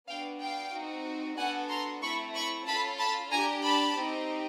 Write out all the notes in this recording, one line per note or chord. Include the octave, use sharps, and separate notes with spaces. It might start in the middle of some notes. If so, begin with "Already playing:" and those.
B3 D4 F#4 F5 G5
F5 G5
C4 D#4 F#4
B3 D4 F#4 A4 F#5 G#5
A#5 C6
A3 C4 E4 B5 C#6
B5 C#6
C#4 F4 A4 A5 B5
A5 B5
D4 G4 G#5 A#5
A5 B5
C4 D#4 G4